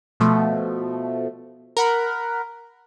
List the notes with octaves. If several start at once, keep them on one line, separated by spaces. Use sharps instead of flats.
B2 F3 A3
A#4 F#5 B5